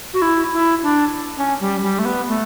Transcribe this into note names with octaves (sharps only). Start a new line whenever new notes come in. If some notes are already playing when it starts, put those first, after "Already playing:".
F#4
E4
E4
D4
C#4
G3
G3
A3
B3
A3